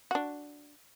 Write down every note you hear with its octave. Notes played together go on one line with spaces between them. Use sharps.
D4 F#4